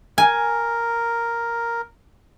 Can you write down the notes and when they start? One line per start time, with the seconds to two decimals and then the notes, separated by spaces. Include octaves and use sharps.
0.18 A#4 G#5